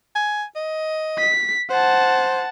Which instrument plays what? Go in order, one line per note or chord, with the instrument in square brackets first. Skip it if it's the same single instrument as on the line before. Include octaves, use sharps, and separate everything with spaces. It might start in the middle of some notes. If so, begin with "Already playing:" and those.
[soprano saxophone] G#5
D#5
[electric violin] B6
[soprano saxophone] C5 [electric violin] F#5 A5